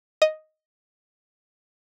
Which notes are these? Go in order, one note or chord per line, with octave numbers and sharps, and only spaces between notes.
D#5